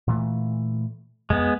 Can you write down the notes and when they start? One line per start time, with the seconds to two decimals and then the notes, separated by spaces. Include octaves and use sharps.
0.08 A#2 E3 A3
1.30 F2 G#3 B3